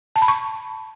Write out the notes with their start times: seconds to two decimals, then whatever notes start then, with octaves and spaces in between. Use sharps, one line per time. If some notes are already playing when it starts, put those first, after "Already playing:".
0.16 A5
0.22 B5
0.28 C#6